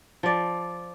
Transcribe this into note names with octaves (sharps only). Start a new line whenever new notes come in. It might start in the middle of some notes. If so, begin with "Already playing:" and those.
F3 D5